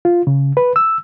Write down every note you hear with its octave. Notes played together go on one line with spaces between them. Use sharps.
F4
C#3
B4
E6